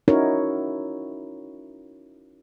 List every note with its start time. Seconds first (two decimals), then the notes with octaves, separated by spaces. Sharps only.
0.08 C#4 D#4 E4 F#4 A#4 C#5